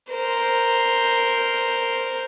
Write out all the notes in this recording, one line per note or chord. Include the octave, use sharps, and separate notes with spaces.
A#4 C5